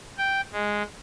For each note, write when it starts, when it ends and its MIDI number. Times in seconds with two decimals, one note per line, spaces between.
0.18 0.41 79
0.52 0.83 56